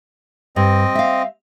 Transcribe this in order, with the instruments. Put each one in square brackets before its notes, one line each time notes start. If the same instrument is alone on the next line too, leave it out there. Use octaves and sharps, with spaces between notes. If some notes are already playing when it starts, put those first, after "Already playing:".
[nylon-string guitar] G2 [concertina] C4 D#5
[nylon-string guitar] E5 F5